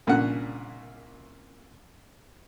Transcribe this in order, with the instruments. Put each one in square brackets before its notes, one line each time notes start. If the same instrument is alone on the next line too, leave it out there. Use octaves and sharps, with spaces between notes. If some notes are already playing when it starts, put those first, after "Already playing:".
[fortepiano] C2 A#2 C#3 C#4 D4 F#5